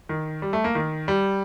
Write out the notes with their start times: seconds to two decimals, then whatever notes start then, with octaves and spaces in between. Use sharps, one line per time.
0.09 D#3
0.42 G3
0.53 A3
0.64 A#3
0.75 D#3
1.08 G3